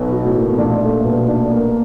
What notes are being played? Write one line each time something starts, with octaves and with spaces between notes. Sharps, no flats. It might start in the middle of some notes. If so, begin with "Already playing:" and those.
Already playing: B1 B2 B4
F#4
A2
A#3
B2
A#1 A#2 D4
A3
B2
D4
A#3